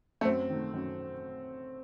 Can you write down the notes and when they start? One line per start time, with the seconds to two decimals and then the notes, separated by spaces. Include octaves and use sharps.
0.21 A3
0.25 F#2 C4
0.49 D#3 A3
0.74 F#2